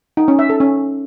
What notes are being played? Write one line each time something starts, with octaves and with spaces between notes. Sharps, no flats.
D#4
C#4
E5
A4
C#4